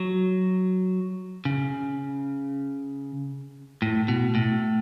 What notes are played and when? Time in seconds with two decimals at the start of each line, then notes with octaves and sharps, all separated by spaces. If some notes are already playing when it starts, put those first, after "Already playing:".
Already playing: F#3
1.45 C#3
3.82 A2
4.08 B2
4.35 A2